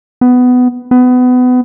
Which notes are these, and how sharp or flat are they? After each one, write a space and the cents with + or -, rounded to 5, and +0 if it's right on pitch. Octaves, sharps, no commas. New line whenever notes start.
B3 +15
B3 +25